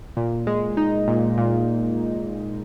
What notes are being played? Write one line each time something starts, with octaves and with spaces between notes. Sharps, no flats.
A#2
G#3
D#4
A#2
A#2